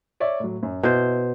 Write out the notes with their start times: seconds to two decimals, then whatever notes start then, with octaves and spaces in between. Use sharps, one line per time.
0.20 C#5 D5 E5
0.40 A2 F#3
0.63 F#2
0.83 B2 E4 C5